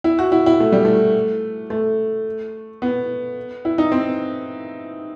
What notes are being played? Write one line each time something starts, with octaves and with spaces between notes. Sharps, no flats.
E4
F#4
E4
E4
A3
G3
A3
A3
B3
E4
D#4
C4